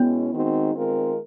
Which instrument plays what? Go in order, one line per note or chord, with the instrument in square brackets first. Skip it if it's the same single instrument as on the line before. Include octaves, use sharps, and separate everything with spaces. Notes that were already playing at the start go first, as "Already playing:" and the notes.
Already playing: [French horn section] B2 G#3 C#4 E4 [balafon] B3
[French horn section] D#3 G#3 C4 D#4 F#4
D#3 G#3 C4 F4 A#4